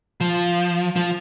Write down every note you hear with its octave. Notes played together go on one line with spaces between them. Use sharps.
F3
F3